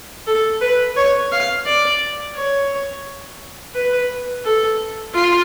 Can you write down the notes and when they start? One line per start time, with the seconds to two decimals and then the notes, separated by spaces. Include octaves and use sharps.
0.27 A4
0.61 B4
0.97 C#5
1.32 F5
1.66 D5
2.36 C#5
3.75 B4
4.45 A4
5.14 F4